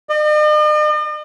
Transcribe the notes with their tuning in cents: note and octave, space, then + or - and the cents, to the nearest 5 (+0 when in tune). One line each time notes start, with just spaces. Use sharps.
D#5 -45